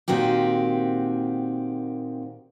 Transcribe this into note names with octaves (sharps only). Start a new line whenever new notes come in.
A#2 D#3 C4 F#4 G4